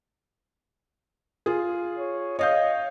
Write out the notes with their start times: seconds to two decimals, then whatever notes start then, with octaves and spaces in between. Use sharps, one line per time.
1.46 F4 G#4
1.98 C#5
2.39 C#5 D#5 F5 G6